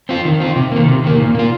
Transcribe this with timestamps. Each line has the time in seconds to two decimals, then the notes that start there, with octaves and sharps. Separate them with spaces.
0.09 C4 F4
0.25 D#3
0.40 C4 F4
0.56 C3
0.72 D#3 A#3
0.88 C3
1.04 D#3 A#3
1.19 A#2
1.35 A#3 F4